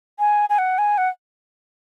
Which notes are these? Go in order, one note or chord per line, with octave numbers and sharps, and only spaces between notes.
G#5
G#5
F#5
G#5
F#5